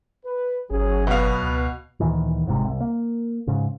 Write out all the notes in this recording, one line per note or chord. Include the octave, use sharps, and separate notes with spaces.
B4
G1 F#3 C#4 G#4
B2 B3 F5
C#2
D2 A#2 D#3 E3
G1 C2 G#2 C3
C2
A#3
G#2 C#3